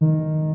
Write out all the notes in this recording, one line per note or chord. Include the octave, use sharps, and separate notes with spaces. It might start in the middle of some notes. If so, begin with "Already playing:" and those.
D#3